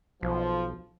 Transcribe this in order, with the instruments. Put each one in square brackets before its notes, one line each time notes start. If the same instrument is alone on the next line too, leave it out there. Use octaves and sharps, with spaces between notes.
[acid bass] B1 [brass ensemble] F3